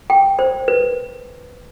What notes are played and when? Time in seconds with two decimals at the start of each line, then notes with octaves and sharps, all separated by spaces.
0.10 G5
0.39 C5
0.68 B4